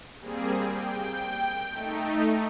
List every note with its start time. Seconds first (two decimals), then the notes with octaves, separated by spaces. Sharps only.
0.20 G3 A#3 C4 G#4
0.68 G5
1.70 A3 D#4